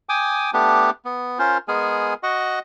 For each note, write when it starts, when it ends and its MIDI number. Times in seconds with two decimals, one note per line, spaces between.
0.09 0.51 79
0.09 0.51 80
0.09 0.51 86
0.09 0.51 87
0.53 0.90 57
0.53 0.90 59
0.53 0.90 62
0.53 0.90 67
1.05 1.39 59
1.39 1.58 61
1.39 1.58 65
1.39 1.58 70
1.39 1.58 72
1.68 2.14 56
1.68 2.14 59
1.68 2.14 68
1.68 2.14 70
1.68 2.14 80
2.23 2.59 66
2.23 2.59 75
2.23 2.59 78
2.23 2.59 85